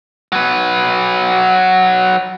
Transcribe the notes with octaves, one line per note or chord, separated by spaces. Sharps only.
F#3 B4